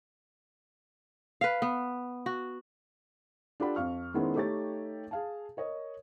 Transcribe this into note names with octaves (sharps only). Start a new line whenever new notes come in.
B4 F5
B3
F#4
D4 F4 G4 A4 F#5 B5
F2 F5 C#6 F6
D#3 G#3 B3 C#4 E4 C5
A3 D#4 G4 C#5 G5 A6
G#4 F5 A5
A#4 C#5 D#5